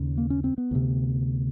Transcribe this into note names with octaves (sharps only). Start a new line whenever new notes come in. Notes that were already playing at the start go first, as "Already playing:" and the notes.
Already playing: D#2 C#3
A#3
C#4
C4
B3
D2 C3